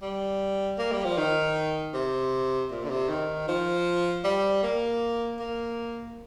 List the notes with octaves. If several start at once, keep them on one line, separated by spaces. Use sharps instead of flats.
G3
A#3
G3
F3
D#3
C3
A#2
D3
C3
D#3
F3
G3
A#3
A#3